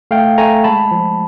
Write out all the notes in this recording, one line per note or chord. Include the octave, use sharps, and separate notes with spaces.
A3 F5 G5
A3 G#5 A#5
G#3 A5 B5
F3